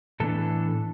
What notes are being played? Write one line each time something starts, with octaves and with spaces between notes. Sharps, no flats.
A2 E3 B3 D4 A4